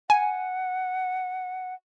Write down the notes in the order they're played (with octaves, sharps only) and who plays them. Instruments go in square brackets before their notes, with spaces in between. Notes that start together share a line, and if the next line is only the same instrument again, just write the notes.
[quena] F#5 [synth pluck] G#5